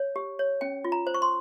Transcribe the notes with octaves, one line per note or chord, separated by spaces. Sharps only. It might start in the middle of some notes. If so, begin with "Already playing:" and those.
Already playing: C#5
G4
C#5
C#4 G5
F4
A#5
C5
C#6
C6